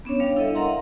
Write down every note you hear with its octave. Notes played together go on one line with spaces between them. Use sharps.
B3 C#4 D4 C#5
G3 D4 C#5 F5
E4 A4 D#5 E5
A#4 D#5 F5 F#5 A#5 C6